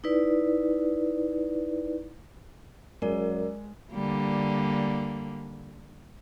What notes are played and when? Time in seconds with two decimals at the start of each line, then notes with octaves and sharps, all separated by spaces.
0.04 D#4 E4 B4 D5
3.02 F#2 G#3 A#4 D5
3.92 D3 G3 A#3